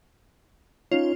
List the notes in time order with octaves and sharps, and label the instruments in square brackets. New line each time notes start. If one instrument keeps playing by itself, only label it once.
[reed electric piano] C#4 D#4 C#5 [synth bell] F4